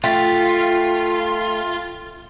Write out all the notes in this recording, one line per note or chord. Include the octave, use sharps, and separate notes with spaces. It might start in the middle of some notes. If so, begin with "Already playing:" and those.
A3 F4 G5 C6 B6